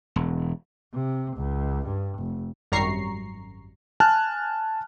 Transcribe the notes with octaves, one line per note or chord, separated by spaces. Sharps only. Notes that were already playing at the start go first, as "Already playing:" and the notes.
E1
C3
C#2
G2
F1
G#1 F#2 G3 A#5 C#6 C7
G#5 A5 F6 F#6